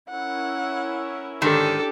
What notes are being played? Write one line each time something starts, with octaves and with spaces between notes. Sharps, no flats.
C#4 E4 A#4 F#5
G#2 D3 D#3 D4 G4 A4